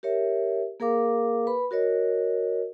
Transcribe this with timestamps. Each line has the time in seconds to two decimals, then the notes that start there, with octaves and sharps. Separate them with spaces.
0.03 G4 A#4 C#5 E5
0.80 A#3 G#4 A#4 F5 D6
1.47 B4 B5
1.71 F#4 A#4 C#5 D#5